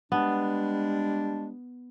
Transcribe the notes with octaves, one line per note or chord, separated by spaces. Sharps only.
G3 G#3 B3 D4